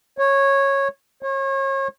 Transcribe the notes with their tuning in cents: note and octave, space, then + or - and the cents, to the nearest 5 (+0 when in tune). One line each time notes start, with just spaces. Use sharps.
C#5 -10
C#5 -35